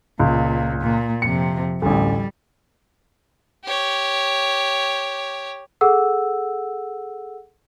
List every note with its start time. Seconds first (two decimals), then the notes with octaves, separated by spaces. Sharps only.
0.20 C#2 A#2
0.82 A#2
1.22 F2 C3 C#7
1.82 A1 D2 G3
3.65 G4 C#5
5.81 G#4 A4 F#5 E6